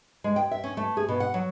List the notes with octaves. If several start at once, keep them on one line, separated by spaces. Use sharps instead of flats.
G#3
G5
E5
C#4
A3
G#4
B2
F#5
F#3